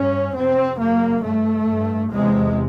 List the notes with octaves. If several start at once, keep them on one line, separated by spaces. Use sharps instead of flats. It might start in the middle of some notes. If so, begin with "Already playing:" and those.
Already playing: G2 C#4
F2 C3 C4
F#2 C#3 A#3
G2 A3
G2
E2 C3 G#3